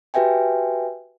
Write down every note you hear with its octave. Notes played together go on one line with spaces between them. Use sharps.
F#4 G4 B4 E5 G5 G#5